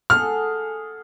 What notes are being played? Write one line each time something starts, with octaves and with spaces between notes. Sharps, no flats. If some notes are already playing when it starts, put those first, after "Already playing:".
G#4 A4 F#5 F6